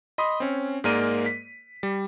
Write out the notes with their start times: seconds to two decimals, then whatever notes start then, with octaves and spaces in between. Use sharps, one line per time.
0.18 D#5 B5 C6 D#6
0.40 C4 C#4
0.84 G#2 G#3 A#3 A#4 D5 D#7
1.26 B6
1.83 G3